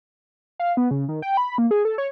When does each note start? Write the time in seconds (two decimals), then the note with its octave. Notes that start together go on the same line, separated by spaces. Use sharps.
0.60 F5
0.77 B3
0.91 C#3
1.09 D#3
1.22 G5
1.37 B5
1.58 A#3
1.71 G#4
1.85 A4
1.98 C#5